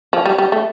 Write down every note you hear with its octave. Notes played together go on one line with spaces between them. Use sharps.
F3
G3
G3
A3